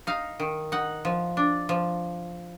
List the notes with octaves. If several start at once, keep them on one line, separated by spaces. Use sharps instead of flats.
D#4 F5
D#3
D#4 F#5
F3
D4
F3